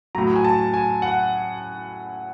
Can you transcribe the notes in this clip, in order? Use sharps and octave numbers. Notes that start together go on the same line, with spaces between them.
A2 F#3 A#5
G#5
A5
G#5
F#5